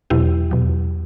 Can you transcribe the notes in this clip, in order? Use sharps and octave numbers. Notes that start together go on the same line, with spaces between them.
E2 B2 F#3 E4 G4
E2 B2 F#3